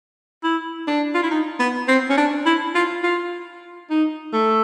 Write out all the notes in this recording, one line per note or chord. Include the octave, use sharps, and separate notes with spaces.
E4
D4
F4
E4
D#4
B3
C4
C#4
D4
E4
F4
F4
D#4
A3